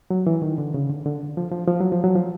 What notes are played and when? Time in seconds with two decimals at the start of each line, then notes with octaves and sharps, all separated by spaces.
0.10 F#3
0.27 E3
0.42 D#3
0.58 D3
0.74 C#3
0.90 D3
1.06 D3
1.37 F3
1.52 F3
1.67 F3
1.80 F#3
1.92 F3
2.04 F#3
2.15 F3